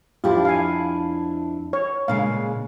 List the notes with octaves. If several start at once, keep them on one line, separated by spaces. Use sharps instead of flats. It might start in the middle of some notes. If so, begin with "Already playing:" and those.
F2 D4 E4 F4 G4
F5 G#5
C#5
A#2 C#3 G#3 F5